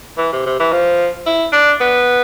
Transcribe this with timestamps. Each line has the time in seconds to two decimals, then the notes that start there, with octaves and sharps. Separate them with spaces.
0.18 E3
0.32 C3
0.46 C3
0.60 E3
0.72 F3
1.26 E4
1.53 D4
1.81 B3